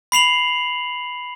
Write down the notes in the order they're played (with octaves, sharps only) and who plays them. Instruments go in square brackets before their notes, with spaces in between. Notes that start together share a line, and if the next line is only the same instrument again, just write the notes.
[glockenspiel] B5 C7 F7 F#7